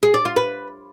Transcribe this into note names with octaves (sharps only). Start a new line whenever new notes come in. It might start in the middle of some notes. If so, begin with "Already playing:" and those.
G#4
D5
F4
B4